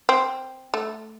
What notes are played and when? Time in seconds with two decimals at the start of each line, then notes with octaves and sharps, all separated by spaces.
0.09 C4
0.74 A3